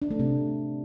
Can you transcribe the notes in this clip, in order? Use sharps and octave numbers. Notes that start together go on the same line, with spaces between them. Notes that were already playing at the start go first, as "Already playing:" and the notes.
D4
A3
C3